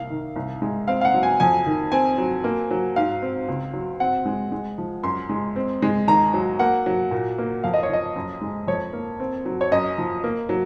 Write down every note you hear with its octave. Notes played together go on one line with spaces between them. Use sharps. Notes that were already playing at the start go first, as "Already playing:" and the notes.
Already playing: C2 A#3 F5
D#3
C2
G#3
C4 F5
F5
F#5
F#3
G#5
F2 G#5
D#3
C4 G#5
F#3
A#3
F#3
G#2 F5
C4
C#2
F#3
C4 F#5
G#3
G#3
F3
F#2 C6
G#3
C4
G#3
D#2 A#5
F#3
A#3 F#5
F#3
A#2
A#3
F2 F5
D#5
C#5
F3 D#5
F#2
G#3
F2 C#5
A#3
C4
F#3
C#5
F#2 D#5
F3
A#3
F#3